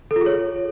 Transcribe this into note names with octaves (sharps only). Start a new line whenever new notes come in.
A4
F4
G#4
C#5